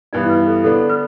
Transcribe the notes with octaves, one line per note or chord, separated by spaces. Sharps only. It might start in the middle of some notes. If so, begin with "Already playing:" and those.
G2 E3 B3 E4 D5
B4
A4
D3 B3 D4 A4
B4